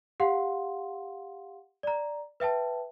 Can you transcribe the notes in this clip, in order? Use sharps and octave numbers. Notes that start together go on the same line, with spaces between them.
G4 F5 F#5 C6
D5 A#5
B4 E5 G5 A5